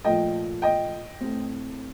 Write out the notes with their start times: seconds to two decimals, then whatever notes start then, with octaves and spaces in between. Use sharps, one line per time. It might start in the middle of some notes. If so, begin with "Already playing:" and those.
0.04 A#2 F3 A3 D#5 G5
0.62 D#5 G5
1.21 A2 A3 C4